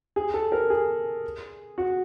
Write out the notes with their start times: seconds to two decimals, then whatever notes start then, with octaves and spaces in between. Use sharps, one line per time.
0.16 G#4
0.34 A4
0.52 A#4
0.70 G#4
1.78 F#4